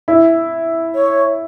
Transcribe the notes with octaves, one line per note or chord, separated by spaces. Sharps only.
E4
C#5